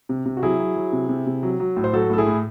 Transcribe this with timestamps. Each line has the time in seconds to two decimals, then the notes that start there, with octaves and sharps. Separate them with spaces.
0.09 C3
0.26 C3
0.37 F#4
0.43 F#3 E4 G#4
0.59 F#3
0.76 F#3
0.93 C3
1.09 C3
1.26 C3
1.43 F#3
1.60 F#3
1.77 A2
1.84 C5
1.93 F#3 F#4 A4
2.10 A2 A4
2.18 E4 G#4
2.27 A2